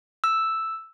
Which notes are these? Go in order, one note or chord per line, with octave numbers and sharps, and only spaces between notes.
E6